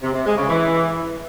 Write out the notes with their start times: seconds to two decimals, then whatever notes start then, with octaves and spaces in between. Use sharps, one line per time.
0.03 C3
0.14 C3
0.26 G#3
0.37 C#3
0.49 E3